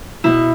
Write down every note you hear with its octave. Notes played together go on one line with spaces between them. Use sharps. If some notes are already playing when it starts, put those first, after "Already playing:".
B2 B3 E4